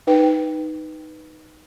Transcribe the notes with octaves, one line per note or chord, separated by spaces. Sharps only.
D#4 B4 G5